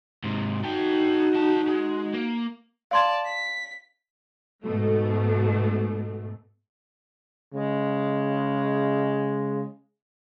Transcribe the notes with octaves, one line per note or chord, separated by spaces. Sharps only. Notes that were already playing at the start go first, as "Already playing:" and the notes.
G#2 C3
D#4 F#4 A4 G5
F#3 A5
G#3
A#3
D5 F5 A5 C6 G#6
B6
G#2 B2 A3
C#3 G#3